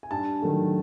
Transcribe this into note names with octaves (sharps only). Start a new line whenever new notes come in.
G#5
G2 A5
D#3 F#3 A3